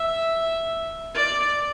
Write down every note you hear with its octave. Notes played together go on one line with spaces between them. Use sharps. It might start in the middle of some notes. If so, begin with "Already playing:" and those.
Already playing: E5
D5